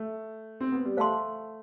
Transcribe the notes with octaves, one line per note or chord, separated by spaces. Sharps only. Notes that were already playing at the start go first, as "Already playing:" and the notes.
Already playing: A3
C4
B3
G3
A3 C5 F5 A5 C6